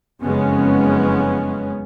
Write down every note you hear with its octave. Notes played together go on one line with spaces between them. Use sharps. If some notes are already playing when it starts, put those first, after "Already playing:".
F#1 F2 C#3 G#3 B3 C#4